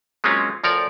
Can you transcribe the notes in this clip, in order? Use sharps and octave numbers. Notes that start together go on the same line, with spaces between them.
F#3 G#3 A#3 C4 C#4 F4
D2 F3 A#4 C#5 D5